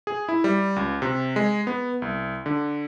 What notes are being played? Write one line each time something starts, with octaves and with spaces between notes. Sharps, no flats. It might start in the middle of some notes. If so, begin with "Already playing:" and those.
G#4
E4
G3
C#2
C3
G#3
B3
C2
D3